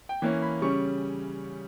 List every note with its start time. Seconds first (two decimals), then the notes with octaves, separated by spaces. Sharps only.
0.09 G5
0.22 E3 A#3 C#4
0.42 B5
0.62 C#3 G3 C#4 C#6